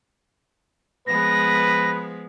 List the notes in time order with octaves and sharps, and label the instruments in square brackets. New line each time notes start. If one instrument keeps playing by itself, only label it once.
[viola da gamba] F3 G#3 B3 [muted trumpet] B4 [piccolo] A#6